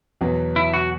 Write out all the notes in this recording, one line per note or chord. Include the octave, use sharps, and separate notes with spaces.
E2 B2 F#3 B3
E4
F#4